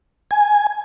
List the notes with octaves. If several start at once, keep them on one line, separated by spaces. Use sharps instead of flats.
G#5